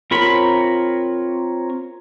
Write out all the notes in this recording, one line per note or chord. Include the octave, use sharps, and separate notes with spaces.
C4 F4 A#4 C#5 B5